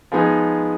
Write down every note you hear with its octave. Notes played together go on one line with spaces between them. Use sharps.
F3 G#3 B3 D#4 G#4